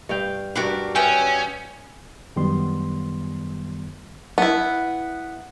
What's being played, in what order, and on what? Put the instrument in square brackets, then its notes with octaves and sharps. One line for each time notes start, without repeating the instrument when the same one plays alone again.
[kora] G2 F5 G5
[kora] G2 F#4 F#5 [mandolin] D4 G4 A#4
[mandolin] B3 E5 G5 [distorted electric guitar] C#4 [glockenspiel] G#5
[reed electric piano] F#2 D#3 G3 B3 C6
[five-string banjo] B3 E4